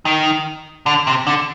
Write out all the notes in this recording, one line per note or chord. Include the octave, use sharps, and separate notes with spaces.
D#3
D3
C3
D3